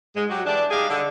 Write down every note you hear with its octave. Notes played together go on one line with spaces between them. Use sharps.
G#2 G#3
F#3 F#4 G4
E3 D4
G3 D#4 G4 G#4 D5 F5
D3